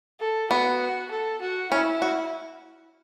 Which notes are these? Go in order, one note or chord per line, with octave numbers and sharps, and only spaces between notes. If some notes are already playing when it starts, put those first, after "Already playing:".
A4
B3 F#4
A4
F#4
C#4 E4
F#4